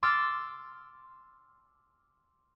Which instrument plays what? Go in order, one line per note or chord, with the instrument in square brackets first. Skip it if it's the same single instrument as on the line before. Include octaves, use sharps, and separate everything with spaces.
[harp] C6 D6 E6 F6 A6